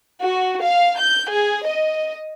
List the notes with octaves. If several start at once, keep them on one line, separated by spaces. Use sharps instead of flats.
F#4
F5
G6
G#4
D#5